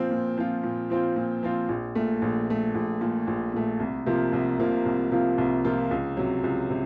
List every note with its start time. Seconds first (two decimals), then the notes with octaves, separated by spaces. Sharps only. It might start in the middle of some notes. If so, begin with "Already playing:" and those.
Already playing: A#2 F3 C4 F4
0.11 A#2
0.38 F3 C4 F4
0.63 A#2
0.90 F3 C4 F4
1.16 A#2
1.43 F3 C4 F4
1.69 A#1
1.95 A#2 A3
2.22 A#1
2.48 A#2 A3
2.75 A#1
3.01 A#2 A3
3.28 A#1
3.54 A#2 A3
3.80 C2
4.06 C3 F3 A#3 F4
4.33 C2
4.59 C3 F3 A#3 F4
4.86 C2
5.12 C3 F3 A#3 F4
5.38 C2
5.65 C3 F3 A#3 F4
5.91 C#2
6.17 C3 F#3
6.44 C#2
6.70 C3